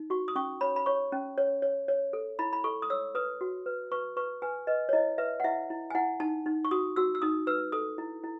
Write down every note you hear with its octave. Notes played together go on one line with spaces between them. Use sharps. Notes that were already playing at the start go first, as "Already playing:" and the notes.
Already playing: D#4
F#4 C#6
D#6
C#4 C#6
C#5 B5
B5
C#5 C#6
C#4
C#5
C#5
C#5
A4
E4 B5
B5
A4 C#6
D#6
C#5 E6
B4 D#6
F#4
B4
B4 C#6
B4 C#6
B4 G#5
B4 D#5
C#5
E4 D#5
B4 E5
F#5
E4 E5
E4
G#5
E4 F#5
D#4 A5
D#4
C#6
F#4 D#6
F#4 E6
E6
D#4 D#6
B4 E6
A4 D#6
E4
E4